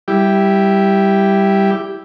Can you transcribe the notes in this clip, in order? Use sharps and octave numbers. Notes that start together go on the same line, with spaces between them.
G3 E4 G4